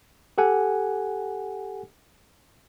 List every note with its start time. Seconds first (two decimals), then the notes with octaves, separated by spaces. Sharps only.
0.38 G4 A4 F#5 G#5